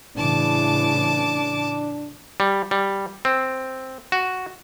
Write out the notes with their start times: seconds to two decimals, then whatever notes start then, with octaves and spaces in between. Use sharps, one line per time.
0.16 A2 C#3 E3 D4 A5 D6
2.40 G3
2.71 G3
3.25 C4
4.12 F#4